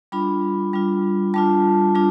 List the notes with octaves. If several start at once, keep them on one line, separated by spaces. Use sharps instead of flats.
G3 D4 F4 B5
G3 D4 F4
G3 D4 F4 A5
G3 D4 F4